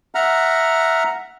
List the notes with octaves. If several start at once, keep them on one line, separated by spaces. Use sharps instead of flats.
E5 F#5 A#5 F6